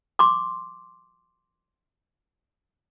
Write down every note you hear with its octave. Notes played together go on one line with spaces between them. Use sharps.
C6 D6